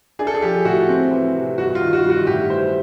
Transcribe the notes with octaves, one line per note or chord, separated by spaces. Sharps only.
D4 G#4
A4
G#4
F3 G4
A2 F#4
C4
E3
C3
G2 F#4
F4
D#3
F#4
G2
F#4
A2 G4
E3 C5